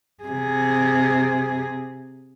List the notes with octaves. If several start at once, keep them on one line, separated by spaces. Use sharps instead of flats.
C3 G#4